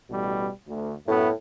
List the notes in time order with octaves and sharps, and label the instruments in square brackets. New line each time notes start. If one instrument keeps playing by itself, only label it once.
[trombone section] A1 B2 G3
D2
[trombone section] F#2 A3 B3 [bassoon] A2